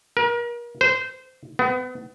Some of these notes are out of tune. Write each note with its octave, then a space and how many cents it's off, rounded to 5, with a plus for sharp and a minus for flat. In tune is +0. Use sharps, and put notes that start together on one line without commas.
A#4 +35
C5 -20
B3 +35